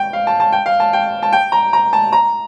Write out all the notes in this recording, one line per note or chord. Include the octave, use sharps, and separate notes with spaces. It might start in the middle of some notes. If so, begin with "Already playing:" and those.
Already playing: G5
F5
A5
A5
G5
F5
A5
G5
A5
G5
A#5
A#5
A5
A#5